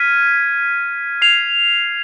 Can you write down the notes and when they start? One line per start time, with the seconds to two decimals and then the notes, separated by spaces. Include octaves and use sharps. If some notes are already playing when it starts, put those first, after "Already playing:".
Already playing: F6 G#6 B6 D#7
1.22 G#6 C7 F7